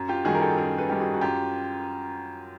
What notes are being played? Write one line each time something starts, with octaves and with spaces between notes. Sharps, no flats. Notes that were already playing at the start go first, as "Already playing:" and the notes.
Already playing: F#2
F4 G4
D#3 G3 F#4 G#4
A#4
G4 A4
F#2 G#4 A#4
A4 B4
D#3 G3 G4
F#4 G#4
F#4
F#2 F4 G4